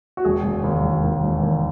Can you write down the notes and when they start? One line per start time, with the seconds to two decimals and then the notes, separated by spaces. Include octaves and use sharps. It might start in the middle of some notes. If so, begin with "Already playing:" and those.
0.17 F#4
0.25 E1 G#4
0.44 E1
0.64 D#2
0.84 E1
1.04 D#2
1.23 E1
1.43 D#2